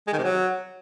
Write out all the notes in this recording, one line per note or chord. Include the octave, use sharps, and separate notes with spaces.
G#3
D#3
C3
F#3